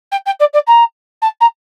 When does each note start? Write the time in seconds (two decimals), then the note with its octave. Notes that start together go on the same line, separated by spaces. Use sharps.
0.12 G5
0.26 G5
0.40 D5
0.53 D5
0.67 A#5
1.22 A5
1.41 A#5